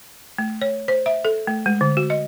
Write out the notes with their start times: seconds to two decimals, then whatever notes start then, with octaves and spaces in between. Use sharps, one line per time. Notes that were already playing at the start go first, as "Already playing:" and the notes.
0.38 A3
0.62 C#5
0.88 C5
1.06 E5
1.25 A4
1.47 A3
1.66 G#3
1.81 D3
1.97 F#4
2.10 D#5